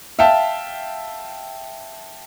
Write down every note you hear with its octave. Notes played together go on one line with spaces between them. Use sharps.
E5 F5 G5 A5